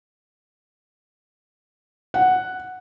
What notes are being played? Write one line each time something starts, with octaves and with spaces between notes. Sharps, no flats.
F#5